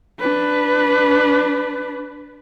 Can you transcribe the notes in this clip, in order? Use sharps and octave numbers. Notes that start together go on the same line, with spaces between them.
D4 B4